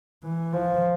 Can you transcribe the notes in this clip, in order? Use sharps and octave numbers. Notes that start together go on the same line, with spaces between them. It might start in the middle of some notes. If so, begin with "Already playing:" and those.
E3
F3